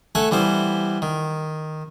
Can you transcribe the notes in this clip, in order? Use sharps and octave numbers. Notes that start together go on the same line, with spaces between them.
A3 A4 F#5 G#5
E3 G3 B3 C5
D#3